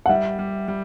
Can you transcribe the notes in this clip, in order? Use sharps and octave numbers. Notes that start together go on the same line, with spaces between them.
F#5
G3 E5
G3
G3